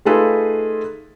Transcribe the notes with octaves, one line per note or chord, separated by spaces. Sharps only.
A3 D#4 F4 G#4 A4 B4